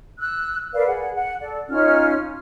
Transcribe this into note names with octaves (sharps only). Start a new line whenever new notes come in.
E6 F#6
A#4 B4 D5 F5
G#4 F#5
F#5
A4 D5
C#4 D#4 F4 F6